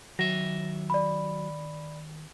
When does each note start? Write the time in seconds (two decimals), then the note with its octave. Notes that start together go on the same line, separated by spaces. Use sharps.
0.19 D#3 F#3 E5 A#6
0.90 D5 B5